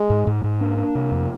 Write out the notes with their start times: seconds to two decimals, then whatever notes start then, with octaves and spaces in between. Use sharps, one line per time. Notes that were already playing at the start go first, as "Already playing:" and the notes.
Already playing: G#3
0.10 G#2
0.27 G#2
0.44 G#2
0.61 A#3 D4
0.78 D4
0.95 C3
1.12 F2